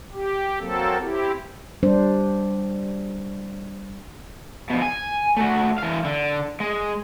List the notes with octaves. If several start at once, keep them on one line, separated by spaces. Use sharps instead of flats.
G4
F#3 A#3 C4 A4
C4 E4 G4
G3 D4 C5
B2 F3
G#5
A3 F#4
E3 F5
D3
G#3